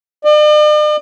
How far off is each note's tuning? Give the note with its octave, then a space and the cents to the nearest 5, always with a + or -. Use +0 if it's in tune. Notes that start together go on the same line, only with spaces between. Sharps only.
D5 +45